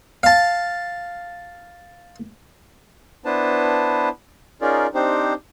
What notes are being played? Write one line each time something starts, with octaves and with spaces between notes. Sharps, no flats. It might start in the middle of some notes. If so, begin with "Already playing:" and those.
F5 A5
B3 D4 E4 B4 C5 A5
C#4 D#4 F4 G#4 A#4 D5
C4 D4 D#4 G4 C5